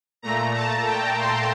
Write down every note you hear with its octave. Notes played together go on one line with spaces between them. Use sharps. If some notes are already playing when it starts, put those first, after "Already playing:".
A#2 A3 A#5
A5
G5
C6